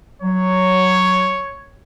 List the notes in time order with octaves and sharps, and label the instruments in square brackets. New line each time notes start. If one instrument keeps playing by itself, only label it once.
[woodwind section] F#3 [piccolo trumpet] C#5